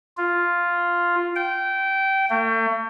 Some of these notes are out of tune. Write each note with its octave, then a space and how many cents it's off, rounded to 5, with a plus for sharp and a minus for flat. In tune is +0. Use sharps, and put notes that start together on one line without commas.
F4 +0
G5 -20
A3 +40